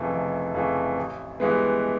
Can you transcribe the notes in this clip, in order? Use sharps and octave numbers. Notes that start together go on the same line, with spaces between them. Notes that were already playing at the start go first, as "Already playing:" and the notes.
Already playing: F1 F2 C#3 E3 A3
F1
F2 C#3 E3 A3
A1
G2 E3 G#3 B3